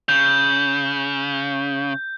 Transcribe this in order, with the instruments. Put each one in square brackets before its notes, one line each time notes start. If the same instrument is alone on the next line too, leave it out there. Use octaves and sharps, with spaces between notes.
[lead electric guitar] C#3 [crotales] G6